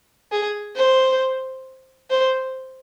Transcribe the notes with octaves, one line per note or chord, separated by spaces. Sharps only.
G#4
C5
C5